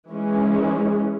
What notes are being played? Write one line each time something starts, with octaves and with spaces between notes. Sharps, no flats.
E3 G#3 C#4